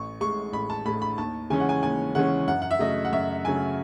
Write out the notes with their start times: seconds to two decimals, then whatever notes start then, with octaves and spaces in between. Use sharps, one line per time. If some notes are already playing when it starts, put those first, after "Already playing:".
Already playing: A1 C#6
0.21 A2 G#3 C#6
0.53 A1 B5
0.70 A5
0.85 A2 G#3 B5
1.02 B5
1.18 D#2 A5
1.50 C#3 E3 G#3 C#4 G#5
1.60 F#5
1.69 G#5
1.83 D#2 G#5
2.15 C#3 E3 G#3 C#4 F#5
2.48 F#2 F#5
2.62 F#5
2.71 E5
2.79 C#3 F#3 A3 D#5
3.05 F#5
3.12 F#2 E5
3.45 C#3 F#3 A3 G#5